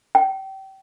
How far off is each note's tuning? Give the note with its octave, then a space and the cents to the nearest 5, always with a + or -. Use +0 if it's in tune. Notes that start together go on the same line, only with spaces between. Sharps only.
G5 -30